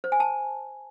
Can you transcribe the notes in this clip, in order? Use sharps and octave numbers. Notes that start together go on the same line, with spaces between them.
C5
G#5
A5